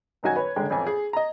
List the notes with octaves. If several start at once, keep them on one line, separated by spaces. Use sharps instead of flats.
D#1 F#2 D#4 F#4 G#5 G#6
B4 C#5
F#1 D3 G#3 G5
A1 F2 G#5
G#4
D#5 A#5